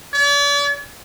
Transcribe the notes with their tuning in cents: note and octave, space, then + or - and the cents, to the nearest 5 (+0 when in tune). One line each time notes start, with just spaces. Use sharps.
D5 -45